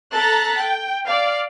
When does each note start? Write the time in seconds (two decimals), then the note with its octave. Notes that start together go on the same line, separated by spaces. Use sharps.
0.14 A4 A#5 F#6 A6 B6
0.59 G5
1.07 D5 F5